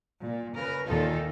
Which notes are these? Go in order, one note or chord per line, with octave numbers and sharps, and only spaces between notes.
A#2
C#3 A#4 B4
D#2 A#2 D#3 D#4 F4 A4